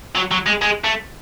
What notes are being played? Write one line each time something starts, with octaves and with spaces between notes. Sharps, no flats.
F#3
F#3
G#3
G#3
A3